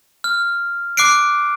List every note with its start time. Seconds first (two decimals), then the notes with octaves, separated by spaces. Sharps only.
0.24 F6
0.97 D6 F#6 C7 D7